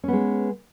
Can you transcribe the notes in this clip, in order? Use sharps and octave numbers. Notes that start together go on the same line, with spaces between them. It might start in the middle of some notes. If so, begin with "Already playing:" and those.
G#3 B3 C#4